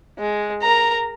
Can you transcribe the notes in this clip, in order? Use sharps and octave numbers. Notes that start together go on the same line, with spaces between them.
G#3
A#4 A#5